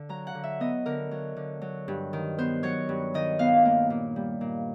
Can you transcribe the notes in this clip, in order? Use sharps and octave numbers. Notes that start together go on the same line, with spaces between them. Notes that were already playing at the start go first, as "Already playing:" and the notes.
Already playing: D3
F#3 A#5
F#5
D3
E5
B3 D#5
D3 A#4
F#3
D3
F#3
G2
D#3
B3 C5
F#3 C#5
G2
D#3 D#5
B3 F5
A#3
A#2
G3
A#2